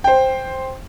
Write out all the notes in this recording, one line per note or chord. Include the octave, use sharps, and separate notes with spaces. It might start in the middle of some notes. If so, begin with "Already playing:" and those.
C5 G5